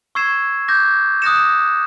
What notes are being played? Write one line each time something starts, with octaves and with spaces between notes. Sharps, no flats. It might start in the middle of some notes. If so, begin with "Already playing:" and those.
C#6 E6 G#6 C7 E7
D6 G6 A#6
D#6 F#6 A#6 C#7 E7